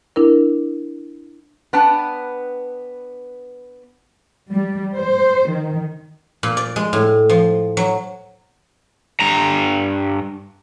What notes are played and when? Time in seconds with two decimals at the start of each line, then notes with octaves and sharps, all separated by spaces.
0.16 D4 E4 A#4
1.73 B3 D4 B4 G5 A5
4.50 G3
4.96 C5
5.51 D#3
6.43 A#2
6.57 D5
6.76 G#3
6.93 A2
7.29 F3
7.77 F#3
9.20 G2 A#5